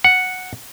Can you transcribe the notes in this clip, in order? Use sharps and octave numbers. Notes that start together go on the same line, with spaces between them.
F#5